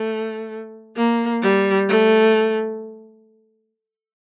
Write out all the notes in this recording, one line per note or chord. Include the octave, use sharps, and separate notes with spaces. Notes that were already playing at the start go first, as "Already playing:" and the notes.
Already playing: A3
A#3
G3
A3